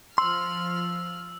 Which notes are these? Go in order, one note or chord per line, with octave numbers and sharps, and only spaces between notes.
F3 C6 E6 F6